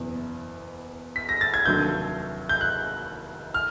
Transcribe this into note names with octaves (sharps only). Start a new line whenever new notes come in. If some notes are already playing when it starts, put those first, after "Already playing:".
Already playing: F#1 E2 B2
B6
A#6
A6
G#6
F1 D#2 D3 F#3 A3 G6
G6
F#6
F6